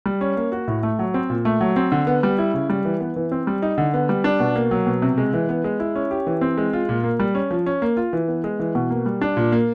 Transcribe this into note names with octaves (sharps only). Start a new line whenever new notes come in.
G3
C#4
A#3
F#4
A2
A3
F#3
C4
A#2
A3
F#3
C4
D3
B3
G3
E4
C#3
G3
E3
B3
E3
C4
G3
D#4
D3
B3
G3
D4
B2
A#3
F#3
B2
C3
G#3
E3
B3
G#3
E4
C#4
G4
E3
C4
G#3
F4
A#2
A#3
G3
C#4
F3
C#4
A#3
F4
E3
B3
G#3
E3
B2
A#3
G3
D4
A#2
A#3